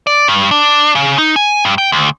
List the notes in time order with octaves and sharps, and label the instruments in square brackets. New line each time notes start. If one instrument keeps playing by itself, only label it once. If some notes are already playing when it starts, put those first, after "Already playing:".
[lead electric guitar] D5
G2
D4
C#3
D#4
G#5
G2
G5
D2